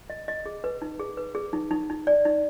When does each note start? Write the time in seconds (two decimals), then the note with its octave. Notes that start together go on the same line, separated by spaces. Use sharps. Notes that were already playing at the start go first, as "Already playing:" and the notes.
0.10 D#5
0.28 D#5
0.46 G#4
0.64 B4
0.82 D#4
0.99 G#4
1.17 B4
1.35 G#4
1.53 D#4
1.71 D#4
1.90 D#4
2.07 D5
2.25 D#4